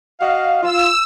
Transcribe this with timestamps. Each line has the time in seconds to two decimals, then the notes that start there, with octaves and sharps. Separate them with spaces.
0.21 F#4 D#5 F5
0.63 F4 E6